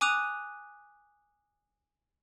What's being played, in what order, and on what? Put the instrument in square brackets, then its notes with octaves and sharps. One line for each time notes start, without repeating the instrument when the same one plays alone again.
[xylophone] G#5 D6 D#6 F#6 D#7 F7